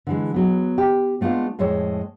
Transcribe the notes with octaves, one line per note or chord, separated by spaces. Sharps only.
D3 E3 G#3
F#3 B3
G4
G#3 A3 B3 D4 F4
F2 A2 G#3 A4 C#5